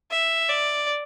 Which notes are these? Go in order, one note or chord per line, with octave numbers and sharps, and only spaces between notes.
E5
D5